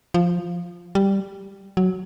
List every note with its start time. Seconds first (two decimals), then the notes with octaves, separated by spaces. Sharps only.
0.14 F3
0.95 G3
1.77 F#3